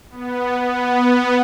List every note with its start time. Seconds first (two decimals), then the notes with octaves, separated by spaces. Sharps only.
0.10 B3
0.61 B3